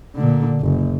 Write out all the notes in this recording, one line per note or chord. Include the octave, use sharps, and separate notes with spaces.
A#2 D3
F#1